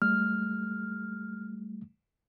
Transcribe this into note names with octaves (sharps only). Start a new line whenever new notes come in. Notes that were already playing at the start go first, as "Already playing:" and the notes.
G3 A3 F6